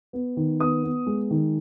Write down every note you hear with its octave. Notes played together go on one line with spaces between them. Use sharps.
B3
D#3
B3 D#6
B3
G#3
D#3